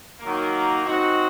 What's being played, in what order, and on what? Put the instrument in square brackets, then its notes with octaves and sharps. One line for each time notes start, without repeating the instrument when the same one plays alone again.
[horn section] D#3 F#3 A#3
F#3 C4 D#4 F#4